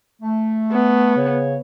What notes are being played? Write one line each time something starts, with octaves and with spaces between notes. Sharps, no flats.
A3
B3
C#3 C#5